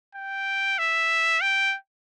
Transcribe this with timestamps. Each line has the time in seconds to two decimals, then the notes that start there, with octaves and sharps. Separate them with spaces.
0.15 G5
0.79 E5
1.42 G5